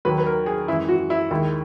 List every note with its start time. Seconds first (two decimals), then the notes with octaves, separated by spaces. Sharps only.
0.05 D#2 D#3 F#3 B4
0.18 B4
0.26 A#4
0.46 G#4
0.68 F#2 E3 G#3 E4
0.88 F#4
1.10 E4
1.31 D#2 D#3 G#3 E4